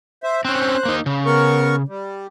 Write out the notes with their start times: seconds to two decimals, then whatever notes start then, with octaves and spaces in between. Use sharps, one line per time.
0.23 C5 E5
0.45 C4 C#4 C5 F#6
0.85 A#3 D#4
1.06 C#3
1.26 B3 A#4 C#6
1.88 G3